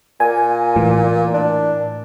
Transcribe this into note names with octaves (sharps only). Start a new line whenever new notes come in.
A#2 G#5
A2 E3
D4